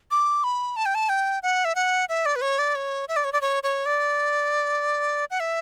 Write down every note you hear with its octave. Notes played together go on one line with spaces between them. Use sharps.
D6
B5
A5
G5
A5
G5
F#5
E5
F#5
E5
D5
B4
C#5
D5
C#5
E5
D5
C#5
D5
C#5
C#5
D5
F#5
E5